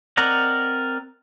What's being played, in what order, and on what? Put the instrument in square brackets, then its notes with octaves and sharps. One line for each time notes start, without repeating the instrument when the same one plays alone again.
[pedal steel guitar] C4 A#4 D5 D#5 F#5